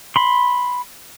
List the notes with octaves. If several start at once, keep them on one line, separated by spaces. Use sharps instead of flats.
B5 C6